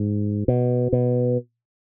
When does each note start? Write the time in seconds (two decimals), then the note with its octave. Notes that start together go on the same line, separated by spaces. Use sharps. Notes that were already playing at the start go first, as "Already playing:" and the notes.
Already playing: G#2
0.48 B2
0.93 B2